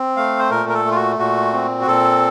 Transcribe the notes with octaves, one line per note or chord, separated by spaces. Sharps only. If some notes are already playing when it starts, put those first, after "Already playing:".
Already playing: C4
A3 F5
C5
A#2 A#4
A#4
A4
A3
F4
F#4
A#2 F#4
C4
F#4
A#2 A4